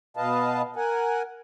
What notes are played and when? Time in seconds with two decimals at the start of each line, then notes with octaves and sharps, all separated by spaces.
0.17 B2 B4 D#5 F5 A5
0.76 A#4 F#5 G#5